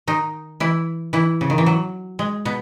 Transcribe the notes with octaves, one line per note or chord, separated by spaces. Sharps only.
D#3 D#4
E3 E4
E3 E4
C#3
D#3
E3
F#3
G#3
B2 B3